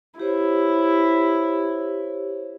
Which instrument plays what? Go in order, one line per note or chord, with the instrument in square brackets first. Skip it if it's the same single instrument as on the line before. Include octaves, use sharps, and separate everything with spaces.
[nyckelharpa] E4 [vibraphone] G4 C5 C#5